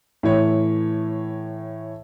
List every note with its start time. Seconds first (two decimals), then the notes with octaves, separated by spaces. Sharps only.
0.23 A2 E3 C#5